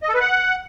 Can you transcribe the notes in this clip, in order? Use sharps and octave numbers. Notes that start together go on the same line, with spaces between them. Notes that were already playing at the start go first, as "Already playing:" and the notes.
D#5
A4
B4
F#5